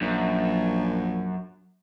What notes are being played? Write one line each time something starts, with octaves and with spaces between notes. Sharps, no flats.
A#1 F#2